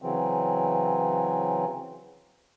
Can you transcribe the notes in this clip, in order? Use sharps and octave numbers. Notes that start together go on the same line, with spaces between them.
C#3 E3 F#3 C4